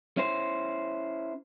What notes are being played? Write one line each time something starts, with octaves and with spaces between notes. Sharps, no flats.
C#4 E4 C5